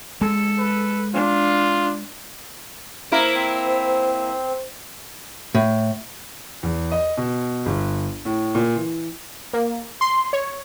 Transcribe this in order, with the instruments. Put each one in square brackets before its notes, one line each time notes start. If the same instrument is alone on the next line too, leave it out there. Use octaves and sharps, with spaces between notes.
[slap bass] G#3 [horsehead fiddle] A4
[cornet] B4
[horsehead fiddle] D4 [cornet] F4
[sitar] A#3 E4 A#4 [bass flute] C5
[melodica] C4
[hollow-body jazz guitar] A2
[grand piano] E2
D#5
B2
G1
A2
A#2
E3
[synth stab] A#3
C6
C#5